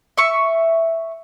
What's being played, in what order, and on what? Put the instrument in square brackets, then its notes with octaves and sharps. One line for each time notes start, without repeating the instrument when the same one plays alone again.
[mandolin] E5 C#6